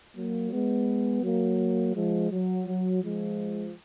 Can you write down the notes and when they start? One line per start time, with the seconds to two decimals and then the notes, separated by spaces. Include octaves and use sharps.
0.16 F#3 A#3
0.51 G#3 B3
1.23 F#3 A#3
1.95 F3 G#3
2.31 F#3
2.67 F#3
3.02 F3 G#3